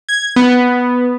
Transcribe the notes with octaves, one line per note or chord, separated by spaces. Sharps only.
G#6
B3